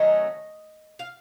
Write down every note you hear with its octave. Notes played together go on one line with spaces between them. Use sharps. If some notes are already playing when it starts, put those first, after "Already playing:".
Already playing: D#3 F#3 A3 C#4 D#5
F5